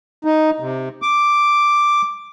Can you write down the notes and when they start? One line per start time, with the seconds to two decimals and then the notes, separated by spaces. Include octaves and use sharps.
0.25 D#4
0.60 C3
1.02 D6